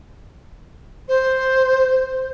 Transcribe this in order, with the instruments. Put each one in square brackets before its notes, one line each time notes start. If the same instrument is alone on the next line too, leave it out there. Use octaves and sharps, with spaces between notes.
[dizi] C5